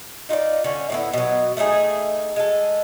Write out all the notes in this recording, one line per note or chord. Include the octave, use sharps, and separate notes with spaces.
D#4 F4 B4 D5
D3 C#4
A2 B3 E4
B2 F#3
A3 D4 D#4 G#4
G#3 A4